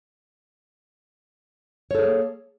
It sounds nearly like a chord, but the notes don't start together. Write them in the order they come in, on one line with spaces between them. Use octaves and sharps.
C#5 A4 G#4 A#3